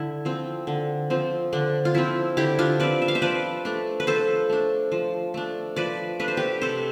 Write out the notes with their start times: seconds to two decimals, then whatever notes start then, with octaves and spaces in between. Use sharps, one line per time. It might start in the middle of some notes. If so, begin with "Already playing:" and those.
Already playing: D3 E4
0.25 F3 C4
0.67 D3
1.10 F3 C4
1.53 D3 D4
1.85 F4
1.95 F3 C4 E4
2.37 D3 E4 G4
2.59 D4 F4
2.80 F3 C4 B4 D5
3.02 E5
3.08 F5
3.15 C5 E5
3.22 F3 B4 D5
3.65 A3 D4
4.00 B4
4.07 F3 A4 C5
4.49 A3 D4
4.92 F3
5.34 A3 D4
5.76 F3 B4 D5
6.20 A3 D4 B4
6.28 C5
6.37 G4 B4
6.62 C3 A4 C5